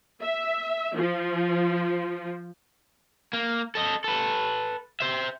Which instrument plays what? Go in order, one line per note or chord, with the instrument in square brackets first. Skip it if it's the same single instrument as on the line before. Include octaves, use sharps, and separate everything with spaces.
[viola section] E5
F3
[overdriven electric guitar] A#3
A4 D#5
A4 B4
C5 E5